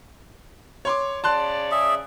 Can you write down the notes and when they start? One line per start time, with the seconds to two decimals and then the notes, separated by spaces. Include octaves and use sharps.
0.85 C#5 C6 D6
1.24 C#3 C#5 D5 A5 C6 F#6
1.72 G#4 E5